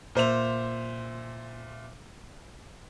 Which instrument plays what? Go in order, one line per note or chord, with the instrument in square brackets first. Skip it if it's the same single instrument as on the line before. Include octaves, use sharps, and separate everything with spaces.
[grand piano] A#2 C5 E5 F7